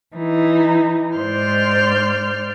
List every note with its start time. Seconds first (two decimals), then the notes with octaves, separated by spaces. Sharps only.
0.16 E3 D#4
1.16 G#2 C5 D5 C6 F6 G6